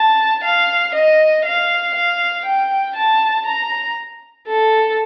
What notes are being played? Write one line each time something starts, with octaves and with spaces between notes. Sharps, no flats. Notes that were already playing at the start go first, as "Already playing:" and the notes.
Already playing: A5
F5
D#5
F5
F5
G5
A5
A#5
A4